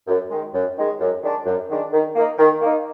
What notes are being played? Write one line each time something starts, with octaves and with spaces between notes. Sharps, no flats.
F#2
D#3 G#3
F#2
D#3 G#3
F#2
D#3 G#3 D4
F#2
D#3 G#3 D4
D#3
A#3 D#4
D#3
A#3 D#4